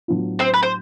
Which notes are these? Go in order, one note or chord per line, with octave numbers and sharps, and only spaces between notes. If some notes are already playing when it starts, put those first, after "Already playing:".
A2 F#3 B3 D4 F4
C4 C5
B4
C5